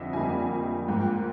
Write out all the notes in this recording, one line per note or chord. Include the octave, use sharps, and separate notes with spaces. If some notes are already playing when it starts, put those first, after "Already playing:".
Already playing: F2 D3 G3 D#5 E5
F2 D3 G3 A#3 G#5
G#2 F3 A#3 G5